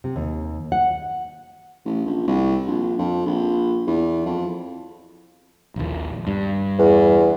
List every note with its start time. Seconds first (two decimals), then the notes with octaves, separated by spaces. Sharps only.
0.04 C3
0.16 D#2
0.72 F#5
1.86 A1
2.06 A#1
2.27 C2
2.66 A#1
2.99 F2
3.26 A#1
3.87 E2
4.26 F2
5.76 A#1 D#2
6.27 G2
6.79 E2